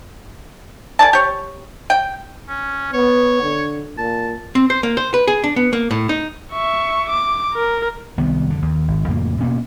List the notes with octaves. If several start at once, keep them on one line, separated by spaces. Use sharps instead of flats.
G#4 A#4 D5 A5
G4 C#5
G5
C#4
B3 C#5
D3
A#2 A5
C4
C5
A#3
C5
B4
G#4
D4
B3
A#3
A2
D#4
E5 C#6
D6
A#4
C2 D#3 B3
F2 D3
D#2
G#1
F2 A2 C#3 A#3
B2 A#3 B3 C#4